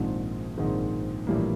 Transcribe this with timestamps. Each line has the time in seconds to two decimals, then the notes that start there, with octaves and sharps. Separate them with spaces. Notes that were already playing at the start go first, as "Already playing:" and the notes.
Already playing: A#1 G#2 D#3 G#3 C4
0.57 A#1 G#2 D#3 G#3 C4
1.27 A#1 A2 E3 G3 A#3